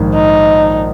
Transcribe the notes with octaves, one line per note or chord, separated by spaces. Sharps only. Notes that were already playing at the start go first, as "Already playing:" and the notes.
Already playing: A#1 G#2 D#3 A#3
D#4